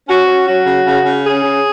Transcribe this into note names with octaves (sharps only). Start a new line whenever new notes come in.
C#4 F#4
C#4
F#3 F#4
C#3
C#3
C#3
C#4 G#4
C#3